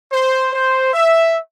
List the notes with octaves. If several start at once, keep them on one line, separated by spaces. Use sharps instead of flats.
C5
C5
E5